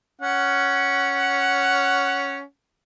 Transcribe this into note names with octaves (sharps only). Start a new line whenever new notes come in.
C#4 F#5